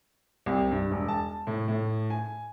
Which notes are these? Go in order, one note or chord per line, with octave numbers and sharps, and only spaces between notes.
C2
G2
E1
A5
A2
A2
G#5